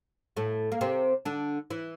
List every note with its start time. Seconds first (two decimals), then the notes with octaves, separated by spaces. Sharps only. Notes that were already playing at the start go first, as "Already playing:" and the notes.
0.37 A2 A3
0.72 A#3
0.81 C3 C4
1.25 D3 D4
1.70 E3 E4